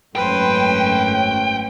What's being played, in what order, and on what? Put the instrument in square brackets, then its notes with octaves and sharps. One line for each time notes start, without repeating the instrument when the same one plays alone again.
[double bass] G#1 A3 [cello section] F#2 C#4 [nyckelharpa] B4 C5 [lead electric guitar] G5